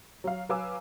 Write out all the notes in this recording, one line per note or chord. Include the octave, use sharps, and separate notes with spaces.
F#3 F5
F#3 B4 F5 G#5 D6 E6